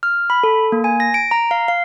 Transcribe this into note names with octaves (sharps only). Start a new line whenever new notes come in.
F6
B5
A4
A#3
G#5
A#6
D7
A#5
F5
F5